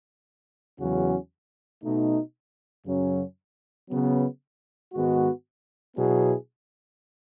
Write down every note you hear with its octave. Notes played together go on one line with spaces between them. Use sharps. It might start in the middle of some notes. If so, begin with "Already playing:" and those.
E2 C#3 F#3 C#4 F#4
B2 A3 D#4
F#2 C#3 F#3 C#4
C#3 F#3 B3
G#2 D#3 G#3 B3 F#4
B2 F#3 B3 E4 G#4